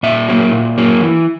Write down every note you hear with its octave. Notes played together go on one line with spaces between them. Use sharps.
A#2 E5
F#3 A#3
A#2
F#3 A#3
E3